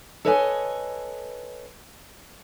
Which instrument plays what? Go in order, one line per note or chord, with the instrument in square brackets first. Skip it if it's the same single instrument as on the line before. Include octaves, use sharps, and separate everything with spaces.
[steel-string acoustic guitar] A4 B4 C#5 D#5 F#5 G#5